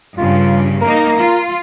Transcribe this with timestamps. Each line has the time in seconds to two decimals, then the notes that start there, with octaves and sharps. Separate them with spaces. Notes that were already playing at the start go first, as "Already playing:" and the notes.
0.18 G2 C#3 F4
0.82 A#3 D#4 A#4
1.18 F4